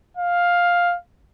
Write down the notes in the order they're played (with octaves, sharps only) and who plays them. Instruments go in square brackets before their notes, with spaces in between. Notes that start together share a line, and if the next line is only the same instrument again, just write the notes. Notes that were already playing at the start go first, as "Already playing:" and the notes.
[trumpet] F5